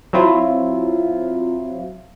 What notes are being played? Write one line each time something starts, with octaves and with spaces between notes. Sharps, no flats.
F#3 C4 E4 F4